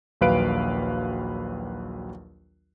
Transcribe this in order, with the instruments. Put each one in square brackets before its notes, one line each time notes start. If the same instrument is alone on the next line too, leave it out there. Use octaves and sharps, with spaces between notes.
[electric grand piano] A#1 D#2 F#3 B4 F5 D7